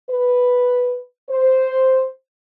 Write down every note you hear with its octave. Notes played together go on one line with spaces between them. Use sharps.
B4
C5